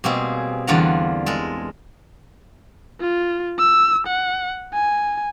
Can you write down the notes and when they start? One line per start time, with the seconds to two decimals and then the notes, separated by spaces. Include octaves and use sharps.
0.04 B2 G3 A#3 C4 G#4
0.67 E2 D3 G3 F4 F#5 A#5
1.26 G#3 A4 A#4
3.01 F4
3.58 E6
4.07 F#5
4.74 G#5